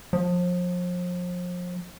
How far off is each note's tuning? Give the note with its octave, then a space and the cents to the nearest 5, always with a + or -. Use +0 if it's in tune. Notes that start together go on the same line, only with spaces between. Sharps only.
F3 +35